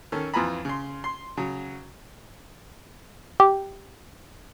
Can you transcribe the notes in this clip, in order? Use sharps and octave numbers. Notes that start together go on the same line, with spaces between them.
D#3 C#4 A4
F2 E3 F4 G#5 A#5 B5
C#3 C6
C6
C#3 F#3
G4